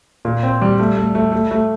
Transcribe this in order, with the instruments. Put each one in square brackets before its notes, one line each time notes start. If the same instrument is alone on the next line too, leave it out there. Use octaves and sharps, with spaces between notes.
[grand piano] A#2
C4
G3
A3
A3
A3
A3
A3